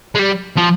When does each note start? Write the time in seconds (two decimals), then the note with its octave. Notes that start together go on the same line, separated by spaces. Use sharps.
0.15 G#3
0.19 G3
0.57 F3